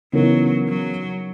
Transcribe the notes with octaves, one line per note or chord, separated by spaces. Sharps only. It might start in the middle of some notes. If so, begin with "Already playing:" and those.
C#3 E3 F#3 B3 D#4 A#4
F#3